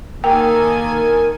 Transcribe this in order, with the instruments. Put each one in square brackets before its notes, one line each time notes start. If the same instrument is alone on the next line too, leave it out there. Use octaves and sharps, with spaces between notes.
[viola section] D#3 A4 G#5 [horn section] A#3 [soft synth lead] A#4 [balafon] G5